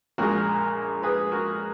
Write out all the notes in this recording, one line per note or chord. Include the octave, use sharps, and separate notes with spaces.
A#1 A#2 G#3 F#4 A#4
G#4 B4
F#4 A#4